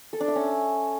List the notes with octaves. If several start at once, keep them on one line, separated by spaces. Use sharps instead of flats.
A4
D4
E5
C#4